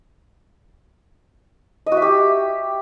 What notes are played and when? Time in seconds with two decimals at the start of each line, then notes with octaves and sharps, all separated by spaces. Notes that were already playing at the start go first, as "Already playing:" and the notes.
1.86 D#5
1.92 F#4
1.97 E5
2.02 G4